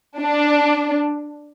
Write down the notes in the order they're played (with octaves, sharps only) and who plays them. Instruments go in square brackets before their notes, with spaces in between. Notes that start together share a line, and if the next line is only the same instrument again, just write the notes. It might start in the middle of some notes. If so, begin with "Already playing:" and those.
[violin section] D4